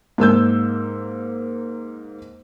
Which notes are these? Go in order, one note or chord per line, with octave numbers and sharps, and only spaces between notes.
G#2 A#3 E6 G6